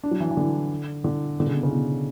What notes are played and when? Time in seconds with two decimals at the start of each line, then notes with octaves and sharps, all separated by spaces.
0.03 D4
0.11 F#3
0.20 E3
0.31 E3
0.37 D3
1.04 D3
1.40 D3
1.46 C#3
1.54 B2
1.63 C#3
1.71 B2